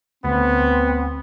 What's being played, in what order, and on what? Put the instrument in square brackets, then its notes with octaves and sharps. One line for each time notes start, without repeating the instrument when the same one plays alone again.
[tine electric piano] D2 [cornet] B3 [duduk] C4